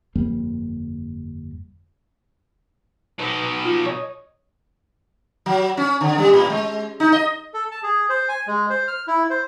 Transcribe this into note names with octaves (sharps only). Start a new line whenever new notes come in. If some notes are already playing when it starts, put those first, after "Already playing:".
G1 F2 G3 A#3
B2 D#4 B4 C5
F4
C#5 D#5
F#3
C#4
D3
G3
A2
G#3
D#4
D#5
A4
A5
G#4
C5
G#5
G#3
C5
F6
E4
C5